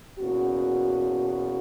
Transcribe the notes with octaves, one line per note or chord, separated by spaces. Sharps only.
E2 B2 A#3 C#4 F#4